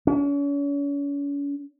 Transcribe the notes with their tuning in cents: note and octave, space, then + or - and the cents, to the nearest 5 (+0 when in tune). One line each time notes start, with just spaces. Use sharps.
C#4 +40